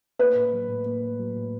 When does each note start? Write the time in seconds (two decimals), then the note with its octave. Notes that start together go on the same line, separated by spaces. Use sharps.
0.19 A#3 B4
0.35 A2
0.53 F#3
0.68 A2
0.86 A#3
1.03 A2
1.19 F#3
1.36 A2